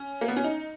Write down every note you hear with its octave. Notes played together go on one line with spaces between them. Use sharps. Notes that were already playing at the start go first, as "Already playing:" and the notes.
Already playing: C#4
A#3
B3
C#4
D#4